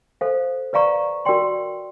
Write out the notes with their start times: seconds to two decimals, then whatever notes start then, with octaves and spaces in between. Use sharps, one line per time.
0.21 A4 C5 F5
0.73 B4 D5 F5 A#5 C#6
1.25 F#4 A#4 D5 G5 C6